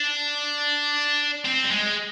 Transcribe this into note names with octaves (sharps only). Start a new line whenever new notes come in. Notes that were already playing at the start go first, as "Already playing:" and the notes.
Already playing: D4
C4
G3
G#3